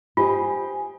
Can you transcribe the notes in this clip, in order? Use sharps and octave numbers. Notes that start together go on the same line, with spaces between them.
F4 G4 C5 D#5 G#5